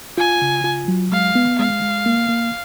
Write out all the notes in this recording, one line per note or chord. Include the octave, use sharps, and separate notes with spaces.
F4 G#5
C#3
F4
F#3
G#3 F5
B3
G#3 F5
G#3
A#3
A#3